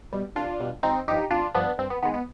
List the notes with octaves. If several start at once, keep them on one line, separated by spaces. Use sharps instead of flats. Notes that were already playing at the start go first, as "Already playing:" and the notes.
B2 G3
C2 D4 F4
B2 G3
G#1 C4 D#4
G2 F3 D#4 G4
G#1 D4 F4
G2 F3 B3 D4
G2 C4
B3
D#3 G#3 B3
B3